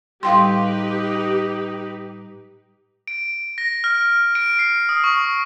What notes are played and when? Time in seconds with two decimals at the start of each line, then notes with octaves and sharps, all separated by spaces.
0.23 A2 G3 D#4 G4 B4 F5 G5 C6
3.08 D7
3.58 A#6
3.84 F6
4.35 D7
4.59 C7
4.89 D#6
5.04 C#6